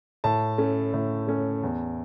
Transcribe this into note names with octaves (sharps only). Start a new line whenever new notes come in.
A2 A5
A3 C#4
A2
A3 C#4
E2